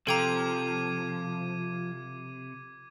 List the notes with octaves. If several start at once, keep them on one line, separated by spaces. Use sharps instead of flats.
C3 F3 A4 G5 A#5 D6 G#6 D#7